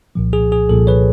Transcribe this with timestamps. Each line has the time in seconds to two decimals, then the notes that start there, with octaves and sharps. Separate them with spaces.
0.15 C2 A#2 F3
0.33 G#4
0.52 G#4
0.69 C2 A#2 F3 A4
0.87 B4 C#5